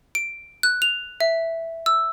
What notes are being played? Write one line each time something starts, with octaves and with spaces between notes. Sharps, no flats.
D7
F#6
F7
E5
E6